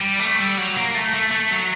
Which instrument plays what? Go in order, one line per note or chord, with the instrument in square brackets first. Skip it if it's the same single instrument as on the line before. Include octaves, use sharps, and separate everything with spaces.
[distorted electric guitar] G3
A3
G3
F#3
A#3
A3
A3
A3
F#3